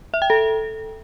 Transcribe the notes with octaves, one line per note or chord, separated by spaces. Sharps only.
E5
G5
A4